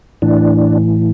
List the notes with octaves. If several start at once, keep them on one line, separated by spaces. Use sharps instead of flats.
A2 E3 D4